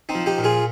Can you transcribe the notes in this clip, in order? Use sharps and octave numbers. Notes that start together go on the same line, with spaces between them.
C4 D#4
F3
D#4 G4
A#2
F4 G#4